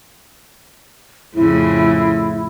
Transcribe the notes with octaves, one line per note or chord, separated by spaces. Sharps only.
F2 A2 C#3 E4